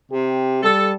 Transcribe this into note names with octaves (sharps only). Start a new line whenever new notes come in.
C3 G4
G3 A4